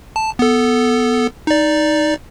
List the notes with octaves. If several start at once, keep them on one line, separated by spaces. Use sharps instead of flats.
A5
B3 A4
D#4 D5